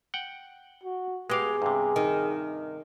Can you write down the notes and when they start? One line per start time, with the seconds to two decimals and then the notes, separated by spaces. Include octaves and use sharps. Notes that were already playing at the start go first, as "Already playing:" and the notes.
0.14 F#5 G5
0.84 F#4
1.30 G#3 B3 G4 G#4 F5
1.62 G2 C3
1.96 D#3